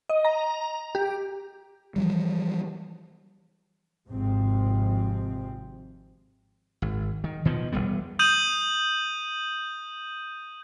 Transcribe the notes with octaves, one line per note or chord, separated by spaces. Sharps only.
D#5
A#5
G4
E3 F3 G3
G#1 G#2 C3 F3 C4
G#1
D#3
B2 D#3 F3
E1 G2 G3 B3
D#6 G6 D#7 F#7